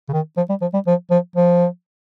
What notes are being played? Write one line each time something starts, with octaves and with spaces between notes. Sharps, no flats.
C#3
D#3
F3
G3
F3
G3
F3
F3
F3